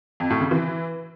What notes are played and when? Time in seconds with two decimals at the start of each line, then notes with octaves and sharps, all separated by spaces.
0.20 F2
0.30 A2
0.41 C#3
0.51 E3